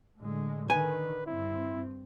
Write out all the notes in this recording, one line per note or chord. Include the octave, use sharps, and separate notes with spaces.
A2 D3 G#3
D3 D#3 B4 G#5
G2 C4 E4